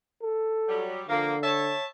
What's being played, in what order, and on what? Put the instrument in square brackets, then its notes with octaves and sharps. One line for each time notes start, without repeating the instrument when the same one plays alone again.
[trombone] A4
[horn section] F#3 G3
[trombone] D3 [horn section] F3 A#3
[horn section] C#5 E5 A5